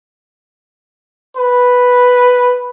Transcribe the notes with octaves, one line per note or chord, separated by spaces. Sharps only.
B4